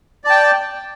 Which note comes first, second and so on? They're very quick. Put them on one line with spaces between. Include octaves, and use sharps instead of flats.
D5 A5 G5